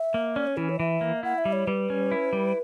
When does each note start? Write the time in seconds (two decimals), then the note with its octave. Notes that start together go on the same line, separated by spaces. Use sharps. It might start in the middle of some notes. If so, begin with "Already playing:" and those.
Already playing: E5
0.14 A#3
0.36 C#4 D5
0.47 C#5
0.57 E3 E4
0.69 C#5
0.80 E3 E5
1.01 A#3
1.23 E4 F#5
1.38 E5
1.45 G3
1.53 C#5
1.67 G3 B4
1.90 C#4
2.11 E4
2.33 G3